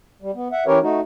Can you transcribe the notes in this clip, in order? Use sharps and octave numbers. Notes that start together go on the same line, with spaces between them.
G3
B3
E5 F#5
E3 C#4 G4 A#4 B4 C#5
A3 D#4 F#4